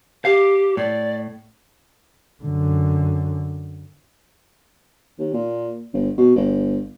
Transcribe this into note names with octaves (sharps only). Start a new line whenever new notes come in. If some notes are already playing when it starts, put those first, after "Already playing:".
G4 F5
A2 D5
F#2 D3
D#2
A#2
G1
B2
G1